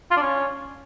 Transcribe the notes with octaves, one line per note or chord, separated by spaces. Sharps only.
F4
D4
C#4